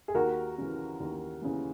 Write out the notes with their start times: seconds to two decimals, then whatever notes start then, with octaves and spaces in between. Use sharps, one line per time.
0.08 G#4
0.15 D#2 F#4 A#4
0.58 C#3 E3
1.00 D#2
1.42 C#3 E3